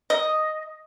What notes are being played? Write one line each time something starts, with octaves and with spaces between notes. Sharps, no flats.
D#5